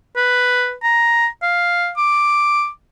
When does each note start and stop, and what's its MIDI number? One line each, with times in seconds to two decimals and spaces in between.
0.16 0.73 71
0.83 1.27 82
1.42 1.90 77
1.97 2.68 86